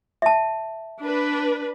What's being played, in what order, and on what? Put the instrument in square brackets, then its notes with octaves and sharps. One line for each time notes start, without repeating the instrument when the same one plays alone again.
[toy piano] E5 A5
[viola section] D4 B4